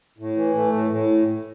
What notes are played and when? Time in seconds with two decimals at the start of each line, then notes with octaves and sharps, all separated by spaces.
0.18 A2
0.36 E3
0.54 A3
0.73 A2
0.90 A2